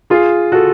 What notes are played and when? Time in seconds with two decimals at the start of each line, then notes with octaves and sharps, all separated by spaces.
0.10 F4 G#4
0.52 F#4 A4